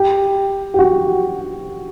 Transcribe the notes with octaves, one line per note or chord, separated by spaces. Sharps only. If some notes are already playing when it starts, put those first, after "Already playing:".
Already playing: G4
G4
F#4